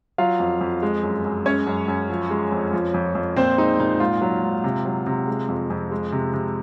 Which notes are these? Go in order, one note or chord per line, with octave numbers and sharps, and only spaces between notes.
F#3 F4 F5
F2
F2
G#3
F#2
F#2
G#3 C#4 C#5
F#2
F#2
F3
G#3
F2
F3
F2
F2
A#2 C4 C5
G#3 D#4
A#2 D#4
G#2 F4
F#3
G#2
C3
F#3
C3
G#3
F2
F2
G#3
C3
C3